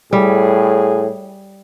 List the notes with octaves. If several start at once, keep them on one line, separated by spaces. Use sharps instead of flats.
A2 G3 G#4